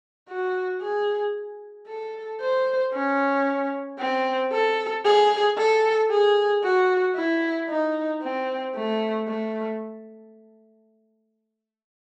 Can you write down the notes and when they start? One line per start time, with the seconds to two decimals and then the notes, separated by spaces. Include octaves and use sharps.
0.29 F#4
0.81 G#4
1.87 A4
2.41 C5
2.93 C#4
3.99 C4
4.52 A4
5.05 G#4
5.57 A4
6.11 G#4
6.64 F#4
7.16 E4
7.69 D#4
8.22 C4
8.75 A3
9.27 A3